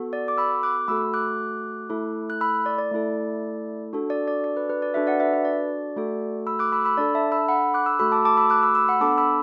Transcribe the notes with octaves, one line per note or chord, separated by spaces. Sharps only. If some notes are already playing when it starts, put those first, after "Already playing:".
Already playing: B3 F#4 A4
D5
D6
B5 E6
D6 F#6
A3 F#4 A4 B5 E6
D6 F#6
A3 E4 A4
F#6
B5 E6
D5
D5
A3 E4 A4
D4 F#4 A4
D5
D5
D5
B4
B4
D5
D4 F#4 A4 B4 E5
D5 F#5
B4 E5
B4
D5
A3 F#4 A4
B5 E6
D6 F#6
B5 E6
B5 E6
D4 A4 D5
E5 A5
B5 E6
F#5 B5
D6 F#6
B5 E6
A3 F#4 A4 B5 E6
A5 D6
A5 D6
B5 E6
D6 F#6
B5 E6
B5 E6
F#5 B5
B3 D4 A4 A5 D6
B5 E6